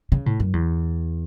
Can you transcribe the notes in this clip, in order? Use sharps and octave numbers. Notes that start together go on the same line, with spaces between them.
C#3
A2
F#2
E2